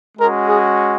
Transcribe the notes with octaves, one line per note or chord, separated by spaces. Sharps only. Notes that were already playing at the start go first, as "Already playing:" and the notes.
G#3 C#4 F#4 A#4
G#4